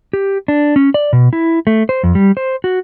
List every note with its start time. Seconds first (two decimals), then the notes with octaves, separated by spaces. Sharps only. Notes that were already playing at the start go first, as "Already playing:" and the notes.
0.13 G4
0.48 D4
0.76 C#4
0.94 D5
1.13 B2
1.33 E4
1.67 A3
1.89 C5
2.03 F2
2.15 G3
2.37 C5
2.64 F#4